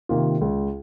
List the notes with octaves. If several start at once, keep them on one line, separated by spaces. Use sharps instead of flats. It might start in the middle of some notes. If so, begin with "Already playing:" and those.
C3 D#3 A#3 F4
C#2